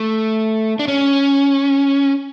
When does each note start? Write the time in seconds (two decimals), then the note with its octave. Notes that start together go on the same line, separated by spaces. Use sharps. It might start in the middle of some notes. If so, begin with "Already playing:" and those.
Already playing: A3
0.79 D4
0.88 C#4